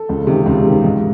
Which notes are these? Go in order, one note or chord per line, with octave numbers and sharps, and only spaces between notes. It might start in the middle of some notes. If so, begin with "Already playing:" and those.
Already playing: A4
C#2
C3 D#3
C#2
C3 D#3
G#2